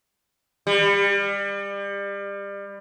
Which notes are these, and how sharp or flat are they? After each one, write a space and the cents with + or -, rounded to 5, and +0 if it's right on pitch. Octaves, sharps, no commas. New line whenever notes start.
G3 +30